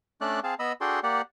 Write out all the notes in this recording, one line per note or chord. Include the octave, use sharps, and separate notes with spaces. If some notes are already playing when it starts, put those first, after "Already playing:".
A3 C#4 D4 D5 F#6
C4 G#4 F5 A5
B3 D#5 B5 E6
D4 F#4 G#4 A4 G5 C6
A#3 G4 D5 F#5